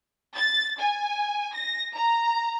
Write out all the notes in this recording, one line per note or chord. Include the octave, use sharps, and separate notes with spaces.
A6
G#5
A#6
A#5